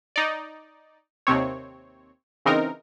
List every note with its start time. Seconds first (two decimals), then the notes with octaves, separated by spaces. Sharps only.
0.16 D#4 D5
1.27 D#2 C3 C4 C#5
2.45 C#3 E3 C4 D#4 A#4